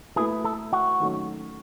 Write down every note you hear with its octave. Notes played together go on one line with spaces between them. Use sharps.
A3 E4 G#4 B4 E5
A4
F#4
D#3 F#3 A3 C#4